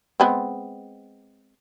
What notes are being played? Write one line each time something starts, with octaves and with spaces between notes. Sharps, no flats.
G#3 B3 C4